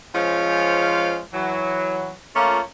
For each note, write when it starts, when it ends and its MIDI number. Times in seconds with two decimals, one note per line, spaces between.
0.15 1.20 53
0.15 1.20 56
0.15 1.20 61
0.15 1.20 72
0.15 1.20 77
1.33 2.13 52
1.33 2.13 54
2.36 2.60 57
2.36 2.60 58
2.36 2.60 61
2.36 2.60 65